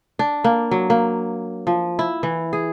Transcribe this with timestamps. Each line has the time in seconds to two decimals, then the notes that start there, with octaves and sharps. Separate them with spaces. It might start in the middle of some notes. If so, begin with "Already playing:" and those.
0.19 D4
0.44 A#3
0.71 F#3
0.90 A#3
1.67 F3
1.99 E4
2.23 E3
2.53 G#4